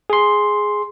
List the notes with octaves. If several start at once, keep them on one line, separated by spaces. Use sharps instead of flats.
G#4 C6